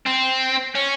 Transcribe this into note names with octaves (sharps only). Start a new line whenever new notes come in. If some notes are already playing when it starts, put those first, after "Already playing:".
C4
C#4